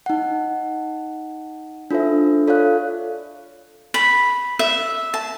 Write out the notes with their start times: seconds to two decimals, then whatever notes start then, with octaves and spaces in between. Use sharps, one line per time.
0.06 D#4 F#5
1.91 D4 F4 A4 C5 E5
2.47 F4 A4 C#5 D5 F5 F#6
3.94 B5
4.59 E5
5.14 A5